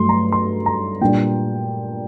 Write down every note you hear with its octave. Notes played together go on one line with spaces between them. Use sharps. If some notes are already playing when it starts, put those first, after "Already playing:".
Already playing: G2 F#3 A3 C6
A#5
C6
A#5
A#2 G3 D4 G5